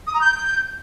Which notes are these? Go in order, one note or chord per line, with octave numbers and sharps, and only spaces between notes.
D#6
A#5
G6